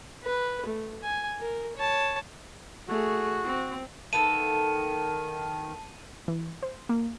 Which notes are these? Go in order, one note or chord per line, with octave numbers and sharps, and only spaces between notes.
B4
A3
G#5
A#4
C#5 A5
A3 F#4 G#4
C4
D#3 A#3 B3 A4 A5 D#7
E3
C5
A#3